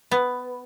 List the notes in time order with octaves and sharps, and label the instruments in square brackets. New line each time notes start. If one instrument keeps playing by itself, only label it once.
[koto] B3